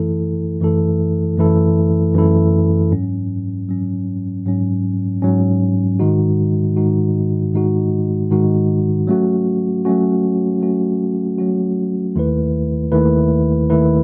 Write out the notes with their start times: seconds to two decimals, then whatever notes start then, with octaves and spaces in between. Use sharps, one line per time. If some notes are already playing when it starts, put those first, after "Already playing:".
Already playing: F#2 E3 A3 E4 A4
0.61 F#2 E3 A3 E4 A4
1.37 F#2 E3 A3 E4 A4
2.14 F#2 E3 A3 E4 A4
2.91 G#2 F#3 C#4
3.69 G#2 F#3 C#4
4.46 G#2 F#3 C#4
5.22 G#2 F#3 C#4
5.99 G#2 D#3 G#3 D#4 F#4
6.77 G#2 D#3 G#3 D#4 F#4
7.53 G#2 D#3 G#3 D#4 F#4
8.31 G#2 D#3 G#3 D#4 F#4
9.07 F#3 A3 C#4 F#4
9.85 F#3 A3 C#4 F#4
10.61 F#3 A3 C#4 F#4
11.38 F#3 A3 C#4 F#4
12.16 D#2 D#3 A3 E4 B4
12.92 D#2 D#3 A3 E4 B4
13.70 D#2 D#3 A3 E4 B4